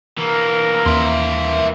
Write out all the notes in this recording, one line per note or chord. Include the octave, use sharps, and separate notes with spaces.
E3 A#3 A#4
D#2 E5 C6